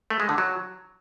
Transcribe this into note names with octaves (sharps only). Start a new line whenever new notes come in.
A3
G#3
D3
F#3